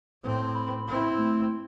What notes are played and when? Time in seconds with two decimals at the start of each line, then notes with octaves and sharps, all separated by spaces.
0.23 A2 C4
0.55 B5
0.88 C4 E4
1.18 A3